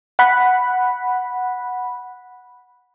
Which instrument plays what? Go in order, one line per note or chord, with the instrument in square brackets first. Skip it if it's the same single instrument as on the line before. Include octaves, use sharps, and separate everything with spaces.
[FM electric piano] F#5 B5